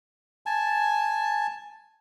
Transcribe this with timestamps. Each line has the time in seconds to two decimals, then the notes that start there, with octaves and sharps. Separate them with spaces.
0.46 G#5 A5